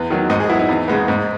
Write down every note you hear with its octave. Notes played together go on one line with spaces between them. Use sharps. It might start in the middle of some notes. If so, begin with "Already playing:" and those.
Already playing: E2 B4
D#3 F#3
G#2 D#5
G#4
F#3 B3 E4
D#4
E2
C#3 G#3 B3
G#2